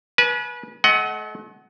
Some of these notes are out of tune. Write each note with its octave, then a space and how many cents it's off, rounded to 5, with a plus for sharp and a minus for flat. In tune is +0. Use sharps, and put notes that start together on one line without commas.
B4 -30 G#5 +40
A3 -40 D#5 +10 F#5 +10